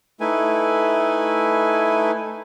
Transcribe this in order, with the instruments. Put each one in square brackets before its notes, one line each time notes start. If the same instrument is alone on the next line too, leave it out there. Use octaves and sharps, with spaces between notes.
[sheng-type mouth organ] A3 D#4 E4 B4 G#5